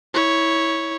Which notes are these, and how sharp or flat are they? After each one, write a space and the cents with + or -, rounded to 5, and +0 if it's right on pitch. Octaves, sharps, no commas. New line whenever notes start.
E4 -15 C#5 +0